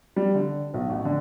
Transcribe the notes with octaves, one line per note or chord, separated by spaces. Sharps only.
G3
D3
B1
A1
D3